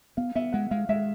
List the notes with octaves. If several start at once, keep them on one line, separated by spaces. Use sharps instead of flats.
B3 F5
B3 E5
G#3 F#5
G#3 F5
G#3 E5